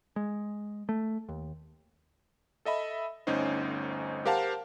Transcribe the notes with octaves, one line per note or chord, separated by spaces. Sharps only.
G#3
A3
D#2
A4 D#5 E5 B5
G1 D2 C#4 D#4 C5
G4 A#4 C5 F5 F#5 A5